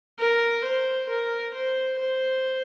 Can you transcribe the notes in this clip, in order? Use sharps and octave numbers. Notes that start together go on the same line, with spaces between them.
A#4
C5
A#4
C5
C5